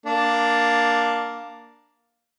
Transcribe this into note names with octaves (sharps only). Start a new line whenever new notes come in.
A#3 D4